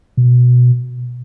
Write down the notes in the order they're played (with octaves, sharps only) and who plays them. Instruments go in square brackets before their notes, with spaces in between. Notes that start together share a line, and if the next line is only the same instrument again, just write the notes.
[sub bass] B2